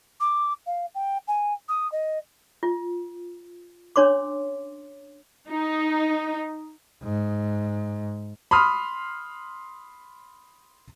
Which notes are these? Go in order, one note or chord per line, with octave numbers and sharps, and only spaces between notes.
D6
F5
G5
G#5
D#6
D#5
F4
C#4 D4 C#5 C6 D6
D#4
G#2
B5 C6 D#6 F6